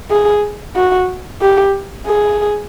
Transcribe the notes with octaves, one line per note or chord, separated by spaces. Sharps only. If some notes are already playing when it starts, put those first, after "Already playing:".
G#4
F#4
G4
G#4